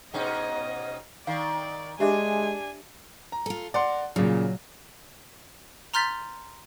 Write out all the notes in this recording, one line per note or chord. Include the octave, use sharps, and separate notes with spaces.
G#2 B2 C#4 D#5
D#3 D5 F5
G#3 D4 G4 E5 G#5 D6
A#5
F4 A4
A#4 D5 F#5 C6
A#2 C#3 F#3
A#5 C6 F6 G6 A6 B6